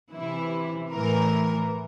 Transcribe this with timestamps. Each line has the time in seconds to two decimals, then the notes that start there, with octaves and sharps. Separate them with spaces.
0.12 C3 E3 E4
0.93 A2 E3 A#4